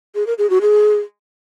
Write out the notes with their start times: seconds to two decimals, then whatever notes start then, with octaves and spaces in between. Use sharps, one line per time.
0.15 G#4
0.27 A#4
0.38 G#4
0.50 F#4
0.62 G#4